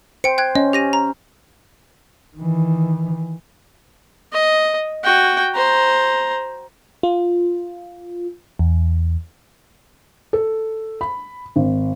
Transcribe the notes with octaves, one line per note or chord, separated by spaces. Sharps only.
C5 G5 C#7
G5 F#6 G#6
C#4 D#5
G4 A#6 D#7
A#5
D#3 E3
D#5
F#4 G5
C5 A#5
F4
E2
A4
B5
G#1